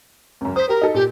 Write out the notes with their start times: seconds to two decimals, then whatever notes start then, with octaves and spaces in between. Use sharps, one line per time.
0.41 C#2 F#2
0.56 C5 D#6 B6
0.69 G4 A#4 A#5
0.81 D#4 A4
0.94 A#2 G4